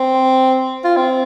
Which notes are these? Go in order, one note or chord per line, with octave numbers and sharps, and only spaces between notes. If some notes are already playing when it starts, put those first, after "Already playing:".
Already playing: C4
F4
C4